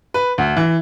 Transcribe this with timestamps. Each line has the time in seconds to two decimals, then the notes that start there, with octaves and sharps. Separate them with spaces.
0.14 B4
0.38 D2
0.57 E3